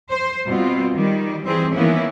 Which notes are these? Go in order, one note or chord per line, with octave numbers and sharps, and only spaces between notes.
C5
B2 G3 C4 F4
D#3 G3
E3 G3 C4 G#4
D#3 E3 A#3 B3 C#4 E4